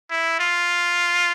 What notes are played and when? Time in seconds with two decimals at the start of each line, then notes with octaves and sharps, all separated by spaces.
0.10 E4
0.40 F4